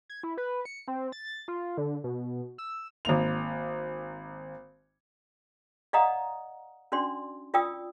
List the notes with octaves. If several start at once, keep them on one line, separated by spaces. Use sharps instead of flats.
G#6
E4
B4
C#7
C4
A6
F4
D3
B2
E6
G#1 A#3 F7
D5 D#5 F5 F#5 A#5 D#6
C#4 D4 F#4 D5 C6
F4 D5 G5 D#6 E6